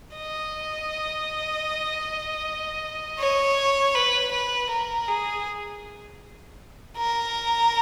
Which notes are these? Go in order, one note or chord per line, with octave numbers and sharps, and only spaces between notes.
D#5
C#5
B4
B4
A#4
G#4
A#4